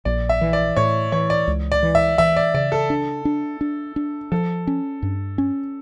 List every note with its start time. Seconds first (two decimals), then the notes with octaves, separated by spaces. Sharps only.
0.05 A#1 D5
0.29 E5
0.41 E3
0.53 D5
0.76 A2 C#5
1.12 E3 C#5
1.30 D5
1.47 C#2
1.72 D5
1.83 E3
1.95 E5
2.18 E3 E5
2.36 D5
2.54 C#3 D5
2.72 A4
2.90 D4
3.25 D4
3.61 D4
3.96 D4
4.32 F3 A4
4.67 C#4
5.02 G2
5.38 C#4